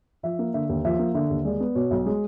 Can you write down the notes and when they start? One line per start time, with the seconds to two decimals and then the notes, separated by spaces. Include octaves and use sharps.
0.23 F3 E5
0.39 A#3
0.54 D3 E5
0.69 D#2
0.85 F3 E5
0.99 A#3
1.14 D3 E5
1.30 D#2
1.45 G#3 D5
1.60 B3
1.75 B2 C#5
1.91 B1
2.06 G#3